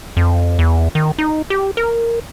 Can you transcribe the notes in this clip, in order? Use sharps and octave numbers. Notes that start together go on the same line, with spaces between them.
F2
E2
D#3
D#4
G4
A#4